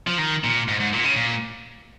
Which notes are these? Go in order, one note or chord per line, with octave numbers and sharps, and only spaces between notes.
F3
D#3
A#2
G#2
G#2
A#2
C#3
A#2